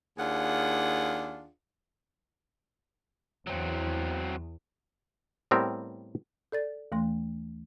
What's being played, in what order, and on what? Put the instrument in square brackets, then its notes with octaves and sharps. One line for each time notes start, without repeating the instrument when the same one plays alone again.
[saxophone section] D#2 D4 F4 G#4 F#5
[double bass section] E2 [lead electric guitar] F#3 C4
[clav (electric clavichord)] A2 G3 B3 C4 A#4
[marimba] A4 D5 A6
D#2 E3 A3 C6